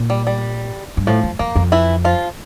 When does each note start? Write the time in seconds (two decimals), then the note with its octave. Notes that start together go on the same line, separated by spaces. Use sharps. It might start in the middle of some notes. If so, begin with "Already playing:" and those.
Already playing: A#2
0.10 G3
0.27 G3
0.97 G2
1.07 A2 F3
1.23 F2
1.39 F2 A#3
1.56 F2
1.72 E3 E4
2.05 F3 F4